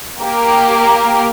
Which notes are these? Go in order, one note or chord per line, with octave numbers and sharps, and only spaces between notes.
A#3 G4 A#4